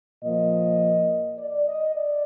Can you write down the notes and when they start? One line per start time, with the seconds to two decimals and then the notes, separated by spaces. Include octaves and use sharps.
0.23 A#2 F3 A#3 D#5
1.37 D5
1.66 D#5
1.94 D5